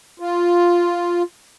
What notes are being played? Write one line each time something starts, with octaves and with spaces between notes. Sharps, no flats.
F4